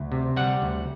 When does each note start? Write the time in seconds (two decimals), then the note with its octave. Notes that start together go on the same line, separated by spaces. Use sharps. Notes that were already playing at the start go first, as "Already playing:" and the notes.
Already playing: D2
0.12 C3
0.36 G3 F#5
0.62 D2